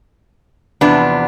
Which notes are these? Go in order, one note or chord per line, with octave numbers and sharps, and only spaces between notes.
E2 C3 F3 B3 D4